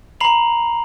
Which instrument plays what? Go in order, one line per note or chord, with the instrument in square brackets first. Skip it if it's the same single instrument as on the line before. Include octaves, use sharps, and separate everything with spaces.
[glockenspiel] A#5 B5 C7 F7 F#7